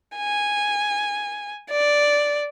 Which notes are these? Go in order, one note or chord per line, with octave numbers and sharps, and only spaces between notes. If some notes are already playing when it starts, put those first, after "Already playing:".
G#5
D5